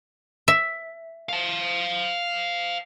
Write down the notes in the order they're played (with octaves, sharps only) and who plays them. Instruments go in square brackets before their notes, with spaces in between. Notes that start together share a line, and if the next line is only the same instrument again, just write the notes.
[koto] E5
[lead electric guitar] F5 A5